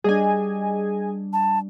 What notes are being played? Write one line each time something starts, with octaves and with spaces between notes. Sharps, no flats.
G3 D4 G#4 D#5 G#5
A5